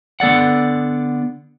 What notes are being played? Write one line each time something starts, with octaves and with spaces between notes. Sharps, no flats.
D3 B3 A4 D5 F#5